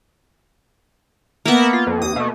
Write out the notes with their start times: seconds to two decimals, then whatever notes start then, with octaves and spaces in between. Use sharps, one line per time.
1.45 A#3 B3 A#4 E5 F#5
1.73 F4
1.87 F2
2.02 D#2 D#6
2.16 B2 A3